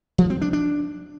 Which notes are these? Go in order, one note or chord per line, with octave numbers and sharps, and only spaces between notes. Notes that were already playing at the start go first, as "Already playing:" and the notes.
F3
C4
D4
D4